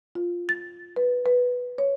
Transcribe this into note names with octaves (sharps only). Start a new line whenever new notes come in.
F4
A6
B4
B4
C#5